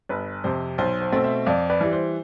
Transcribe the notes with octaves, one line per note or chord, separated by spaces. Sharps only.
G1 B4
F2 C3 C5
B1 C5
C5
B2 A3 C4
C5 E5
F2 D5 F5
B4 D5
E3 G3
C5